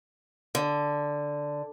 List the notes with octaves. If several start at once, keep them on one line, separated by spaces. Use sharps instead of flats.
D3